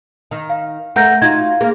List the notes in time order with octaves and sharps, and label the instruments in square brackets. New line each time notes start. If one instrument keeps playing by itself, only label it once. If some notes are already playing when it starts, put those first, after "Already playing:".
[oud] D#3
[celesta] F5
[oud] A3 A#4 [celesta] F#5 G6 A#6
[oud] D#4 F4 F#4 [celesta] G#6
[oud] A#3 [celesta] G#4 F5